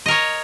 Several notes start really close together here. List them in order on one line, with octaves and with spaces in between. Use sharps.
D#5 A#4 C#5